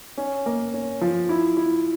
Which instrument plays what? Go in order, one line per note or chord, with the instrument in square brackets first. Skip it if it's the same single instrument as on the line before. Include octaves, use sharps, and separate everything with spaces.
[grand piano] C#4
A#3
C#4
F3
E4
E4